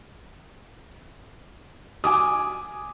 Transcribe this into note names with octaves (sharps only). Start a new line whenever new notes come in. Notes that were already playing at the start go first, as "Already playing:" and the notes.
G#5 D6 D#6